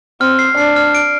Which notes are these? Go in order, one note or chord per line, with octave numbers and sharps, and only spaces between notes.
C4 F6
C7
D4 C7
F6
D7